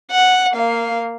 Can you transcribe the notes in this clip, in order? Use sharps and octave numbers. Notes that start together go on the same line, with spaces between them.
F#5
A#3 F5